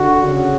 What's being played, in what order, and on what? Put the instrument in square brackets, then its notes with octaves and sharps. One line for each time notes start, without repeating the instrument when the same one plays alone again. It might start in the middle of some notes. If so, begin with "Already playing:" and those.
Already playing: [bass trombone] D3 [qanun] F#4
[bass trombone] C#3